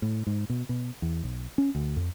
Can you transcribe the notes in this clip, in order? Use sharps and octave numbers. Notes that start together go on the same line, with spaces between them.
A2
G#2
B2
B2
E2
B1
C#4
D2
F2